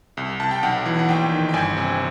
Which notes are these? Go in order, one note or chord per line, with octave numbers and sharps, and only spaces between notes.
C2
C2 A5
G5
B1 F#5
E3
F#5
A#1 G5
D#3
G5
G1 G#5
C3